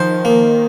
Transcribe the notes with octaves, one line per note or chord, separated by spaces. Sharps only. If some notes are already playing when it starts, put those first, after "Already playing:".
Already playing: D#3 F3 C5
A#3